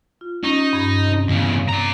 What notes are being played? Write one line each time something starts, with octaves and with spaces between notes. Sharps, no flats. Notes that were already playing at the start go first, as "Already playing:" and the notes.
F4
C#4 D#4
G2 G#6
C3 C4
E2 C#3
D5 A#5